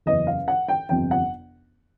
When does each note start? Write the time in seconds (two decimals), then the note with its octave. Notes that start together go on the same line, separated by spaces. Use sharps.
0.06 F#1 E2 C#3 E3 D#5
0.27 F5
0.48 F#5
0.69 G5
0.89 G1 F2 C3 G5
1.11 F#5